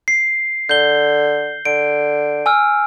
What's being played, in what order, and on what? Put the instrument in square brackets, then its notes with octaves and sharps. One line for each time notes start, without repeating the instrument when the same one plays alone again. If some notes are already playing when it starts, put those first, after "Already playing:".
[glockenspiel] C7
[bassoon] D3 [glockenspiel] G6 G7
[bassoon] D3 [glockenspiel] D7
[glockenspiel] G#5 E6 F6